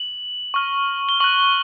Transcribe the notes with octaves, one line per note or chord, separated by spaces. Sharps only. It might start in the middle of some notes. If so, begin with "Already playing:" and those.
Already playing: F#7
C#6 F6
G7
C#6 F#6 F#7